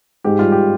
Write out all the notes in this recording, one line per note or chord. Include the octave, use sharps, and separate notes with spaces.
G#2 G4
G3 F4
G4